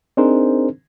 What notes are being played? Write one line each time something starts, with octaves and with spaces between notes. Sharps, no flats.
C4 D4 D#4 G#4 A#4 C5